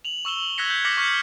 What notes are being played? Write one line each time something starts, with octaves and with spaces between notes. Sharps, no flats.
F7 F#7
C#6 E6 E7 G7
E6 F#6 G#6 A#6 B6 C#7
G6
D6 F6 A#6 B6 C#7 F#7
C#6 F6 G6 C#7